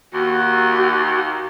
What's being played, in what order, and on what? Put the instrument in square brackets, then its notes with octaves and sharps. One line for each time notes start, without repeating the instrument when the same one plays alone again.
[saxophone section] D#2 [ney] F#4